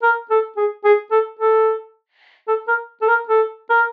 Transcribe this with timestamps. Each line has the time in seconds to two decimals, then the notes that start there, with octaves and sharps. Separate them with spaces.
0.03 A#4
0.30 A4
0.57 G#4
0.84 G#4
1.11 A4
1.39 A4
2.48 A4
2.68 A#4
3.02 A4
3.08 A#4
3.29 A4
3.70 A#4